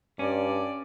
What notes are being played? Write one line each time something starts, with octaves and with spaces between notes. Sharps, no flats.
G2 C#4 D5